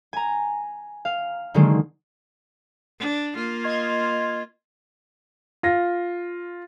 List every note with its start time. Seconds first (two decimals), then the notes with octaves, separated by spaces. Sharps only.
0.13 G#5 A#5
1.05 F5
1.54 D3 D#3 F#3 G#3 A#3
2.99 D4
3.36 A#3 F4
3.64 D#5 C6 G#6
5.63 F4 A#6